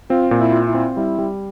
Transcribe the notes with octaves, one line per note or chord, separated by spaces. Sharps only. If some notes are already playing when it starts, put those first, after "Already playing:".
C4 F4
A#2
E4
F4
E4
C4
G3 E4
G3